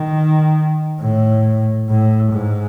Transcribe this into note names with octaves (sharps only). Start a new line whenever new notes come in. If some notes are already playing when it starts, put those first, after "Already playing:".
Already playing: D#3
A2
A2
G#2